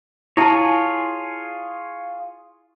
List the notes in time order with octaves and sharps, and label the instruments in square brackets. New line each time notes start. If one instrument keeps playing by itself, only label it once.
[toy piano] E4 G#5 A5 [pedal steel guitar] F4 G#4 C#5